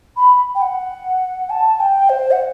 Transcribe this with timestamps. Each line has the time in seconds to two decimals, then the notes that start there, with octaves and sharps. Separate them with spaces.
0.17 B5
0.55 G5
0.61 F#5
1.50 A5
1.80 G5
2.09 C5
2.31 F#5